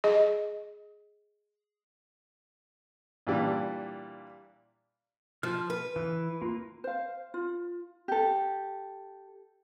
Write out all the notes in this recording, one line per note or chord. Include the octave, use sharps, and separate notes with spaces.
G#4 D#5
A#2 E3 G3 D4
F3 F6
B4
E3
A#3 F4
C5 F5
F4
G4 A4